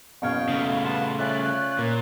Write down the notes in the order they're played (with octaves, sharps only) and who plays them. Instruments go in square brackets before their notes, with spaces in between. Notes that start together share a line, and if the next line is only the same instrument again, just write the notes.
[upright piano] F#1 B2 G#6 [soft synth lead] F5 [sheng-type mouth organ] G5 C#6
[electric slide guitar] C#3 A3
[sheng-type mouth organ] B3 A5 [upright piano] C6
[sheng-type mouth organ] C#4 F4 D5 [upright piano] E5 [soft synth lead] F#6
[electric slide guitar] A#2 [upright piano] A#3